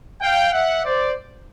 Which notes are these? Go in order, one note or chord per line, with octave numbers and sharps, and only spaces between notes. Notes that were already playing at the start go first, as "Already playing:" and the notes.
F5 G5
E5 F#5
C5 D5